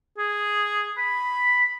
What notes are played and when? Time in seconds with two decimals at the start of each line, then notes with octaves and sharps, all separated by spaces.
0.18 G#4
0.98 B5